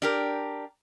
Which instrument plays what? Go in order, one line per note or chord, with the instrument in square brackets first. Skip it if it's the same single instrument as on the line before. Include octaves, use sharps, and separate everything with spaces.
[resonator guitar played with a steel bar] D4 G4 A#4